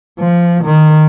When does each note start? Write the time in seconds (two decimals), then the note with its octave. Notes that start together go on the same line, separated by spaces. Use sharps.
0.19 F3
0.64 D#3